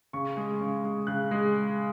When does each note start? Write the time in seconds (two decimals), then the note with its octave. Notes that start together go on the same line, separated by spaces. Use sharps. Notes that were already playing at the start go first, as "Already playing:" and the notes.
0.13 C#3 C#6
0.37 G#3
0.61 C#3
0.84 G#3
1.07 C#3 F#6
1.31 G#3